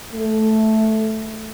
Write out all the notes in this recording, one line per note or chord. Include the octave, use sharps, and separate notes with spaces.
A3